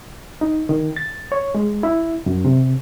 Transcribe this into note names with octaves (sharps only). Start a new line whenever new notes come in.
D#4
D#3
A6
C#5
G#3
E4
F#2
C3